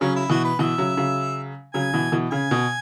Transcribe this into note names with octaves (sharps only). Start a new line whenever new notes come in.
C#3 F#3 C#4
E4
B2 E3 F#4
B4
B2 E3 E5
C#3 F#3
C#3 F#3
C#3 F#3 G#5
B2 E3
B2 E3
C#3 G#5
B2